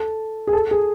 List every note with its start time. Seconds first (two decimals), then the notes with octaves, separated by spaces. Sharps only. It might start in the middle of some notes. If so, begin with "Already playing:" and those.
Already playing: A4
0.47 G#4
0.53 A4
0.71 G#4